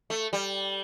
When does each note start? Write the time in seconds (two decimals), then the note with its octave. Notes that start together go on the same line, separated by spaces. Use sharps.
0.10 A3
0.33 G3